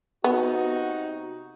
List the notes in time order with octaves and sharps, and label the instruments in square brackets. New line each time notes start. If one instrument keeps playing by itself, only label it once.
[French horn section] C3 D#4 F#4 [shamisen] B3